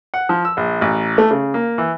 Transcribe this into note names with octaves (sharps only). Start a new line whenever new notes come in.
F#5
F3
E6
A#1
A1
A3
C#3
A#3
E3